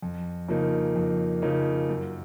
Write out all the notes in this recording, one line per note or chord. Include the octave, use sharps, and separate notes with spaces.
F2
C#3 F3 A#3 D#4
F2
C#3 F3 A#3 D#4
F#2